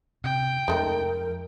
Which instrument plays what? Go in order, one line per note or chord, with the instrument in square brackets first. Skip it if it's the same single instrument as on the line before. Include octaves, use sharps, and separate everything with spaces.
[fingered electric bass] C3 [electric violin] G5
[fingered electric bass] F2 [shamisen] G#3 A3 D#4 [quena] A#4